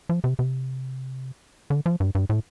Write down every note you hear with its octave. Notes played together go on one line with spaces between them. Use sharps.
F3
C3
C3
D3
F3
G2
G2
A2